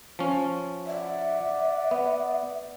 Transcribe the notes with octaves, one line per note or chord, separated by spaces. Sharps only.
F3 C#4
D5 E5 F#5
B3